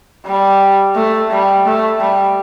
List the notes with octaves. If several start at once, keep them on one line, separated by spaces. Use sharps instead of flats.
G3
A3
G3
A3
G3